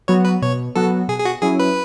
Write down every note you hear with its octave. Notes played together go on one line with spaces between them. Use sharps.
F#3 B3 F#4 C#5
B4
B2 C#5
F#3 B3 F#4 A4
B2 G#4
G#4
F#4
F#3 C#4 E4 G#4
B4